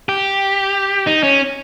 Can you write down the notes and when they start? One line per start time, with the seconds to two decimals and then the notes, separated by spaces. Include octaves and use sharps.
0.09 G4
1.07 D#4
1.23 C#4